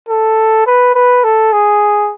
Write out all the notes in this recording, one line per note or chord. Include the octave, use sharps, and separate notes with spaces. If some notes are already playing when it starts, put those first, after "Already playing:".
A4
B4
B4
A4
G#4